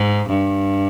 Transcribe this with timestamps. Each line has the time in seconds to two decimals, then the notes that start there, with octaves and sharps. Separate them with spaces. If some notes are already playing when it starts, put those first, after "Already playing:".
Already playing: G#2
0.29 G2